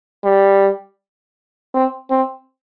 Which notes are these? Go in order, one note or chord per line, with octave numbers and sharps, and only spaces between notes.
G3
C4
C4